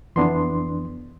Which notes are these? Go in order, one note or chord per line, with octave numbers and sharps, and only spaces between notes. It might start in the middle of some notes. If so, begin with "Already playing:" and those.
F2 E3 B3 D4 C6